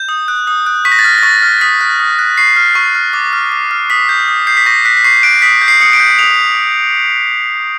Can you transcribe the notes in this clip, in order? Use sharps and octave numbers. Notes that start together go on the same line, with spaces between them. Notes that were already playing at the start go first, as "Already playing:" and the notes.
Already playing: G6
D#6
F#6
D#6
F#6
C#6 B6
A#6
A6
F6 A#6
A#6
C#6 A6
F6
D#6 B6
F#6
D#6
F#6
C#6 C7
F6
C#6
F6
D6
F6
D6
F6
D#6 B6
G6
D#6
G6 C7
B6
C#6 A#6
F#6 B6
B6
C#6 C7
F#6 D7
D#6 B6
G6
C7
D#6 C#7
D7
G6
D#6 F7